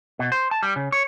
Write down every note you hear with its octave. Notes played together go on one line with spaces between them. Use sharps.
B2
C5
A5
G3
C#3
C#5